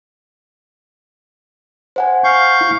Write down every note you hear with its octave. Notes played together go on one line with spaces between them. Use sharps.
C5 F#5 G#5
F5 C#6 G6
E4